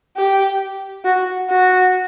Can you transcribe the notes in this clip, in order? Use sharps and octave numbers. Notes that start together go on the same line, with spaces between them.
G4
F#4
F#4